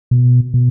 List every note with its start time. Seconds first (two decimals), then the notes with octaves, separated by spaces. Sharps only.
0.11 B2
0.54 B2